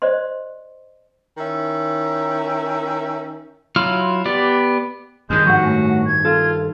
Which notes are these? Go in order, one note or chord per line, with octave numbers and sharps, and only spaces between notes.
C5 D5 D#5 C6
D#3 C#4 E4 E5
F#3 E4 F4 F6
B3 G4 D5
G2 D#3 G#3 G6
F2 G#2 F#4 F#5
A2 G#5
F#5
G#6
F4 A4